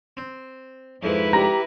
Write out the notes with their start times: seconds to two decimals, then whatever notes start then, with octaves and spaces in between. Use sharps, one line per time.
0.17 C4
1.03 F2 G#2 E4 B4
1.33 G4 A#5 A#6